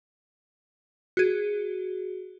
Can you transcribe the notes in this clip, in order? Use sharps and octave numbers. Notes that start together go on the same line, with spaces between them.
F#4 G#4